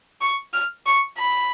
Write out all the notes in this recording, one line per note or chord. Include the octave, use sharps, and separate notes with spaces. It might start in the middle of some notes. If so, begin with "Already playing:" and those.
C#6
F6
C#6
B5